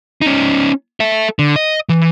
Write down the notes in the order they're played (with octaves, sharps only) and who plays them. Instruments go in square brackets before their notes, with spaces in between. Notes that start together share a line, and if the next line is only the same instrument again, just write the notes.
[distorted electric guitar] C#4 D#4
A4 E5
D3
D#5
E3